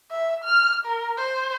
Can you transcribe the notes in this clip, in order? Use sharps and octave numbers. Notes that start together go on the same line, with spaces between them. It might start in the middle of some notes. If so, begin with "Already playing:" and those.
E5
F6
A#4
C5